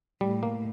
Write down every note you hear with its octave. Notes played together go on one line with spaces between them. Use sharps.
A2 G3
A#3